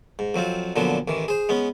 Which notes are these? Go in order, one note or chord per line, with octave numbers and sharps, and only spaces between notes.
G#2
F2 F#3 C4 F4
A#2 D3 F3 F#3 B3
A1 D#3 E3
G#4 C5
G#3 B3 C#4